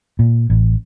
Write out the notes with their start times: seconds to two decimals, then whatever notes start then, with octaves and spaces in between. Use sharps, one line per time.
0.19 A#2
0.50 A1